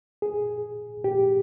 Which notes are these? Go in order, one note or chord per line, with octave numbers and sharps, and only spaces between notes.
G#4
G4